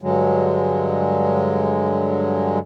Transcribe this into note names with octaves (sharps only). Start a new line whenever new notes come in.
G2 D3 F#3 G#3